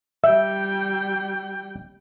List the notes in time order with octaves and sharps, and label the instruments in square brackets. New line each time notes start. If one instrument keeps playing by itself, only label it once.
[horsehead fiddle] G3 G5 [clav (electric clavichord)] E5